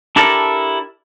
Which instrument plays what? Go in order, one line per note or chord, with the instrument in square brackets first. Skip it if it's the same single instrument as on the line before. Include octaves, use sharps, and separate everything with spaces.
[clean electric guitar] D4 E4 G4 A4 A#4 D5